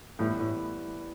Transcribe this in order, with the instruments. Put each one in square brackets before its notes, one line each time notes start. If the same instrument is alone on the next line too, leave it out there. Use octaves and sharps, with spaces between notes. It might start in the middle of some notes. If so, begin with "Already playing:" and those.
[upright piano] A2 [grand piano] E3 G3 B3
[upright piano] A2